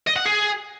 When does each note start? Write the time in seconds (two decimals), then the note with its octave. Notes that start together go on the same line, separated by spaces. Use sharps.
0.07 D#5
0.16 F#5
0.25 G#4